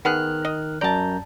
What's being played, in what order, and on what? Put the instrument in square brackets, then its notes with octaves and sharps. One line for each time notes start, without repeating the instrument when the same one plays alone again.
[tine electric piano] D#3 F6 F#6 [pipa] B3 G#4
[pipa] D#5
[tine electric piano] F#2 A#5 G6 [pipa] D5 A5